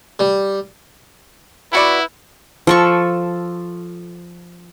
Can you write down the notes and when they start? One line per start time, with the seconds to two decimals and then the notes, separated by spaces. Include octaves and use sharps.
0.19 G3
1.73 B3 E4 F#4 B4 D5
2.67 F3 A4 C#6